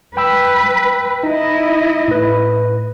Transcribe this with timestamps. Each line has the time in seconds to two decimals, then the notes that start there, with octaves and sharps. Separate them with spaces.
0.17 B4 G5 B5 E6
1.23 D#4 E4 D#5
2.08 A2 B4